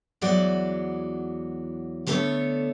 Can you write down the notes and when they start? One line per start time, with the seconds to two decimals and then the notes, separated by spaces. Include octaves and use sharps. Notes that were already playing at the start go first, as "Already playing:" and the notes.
0.21 E2 E3 F#3 G#3 F#4 D5
2.07 D3 A3 B3 A4 C#5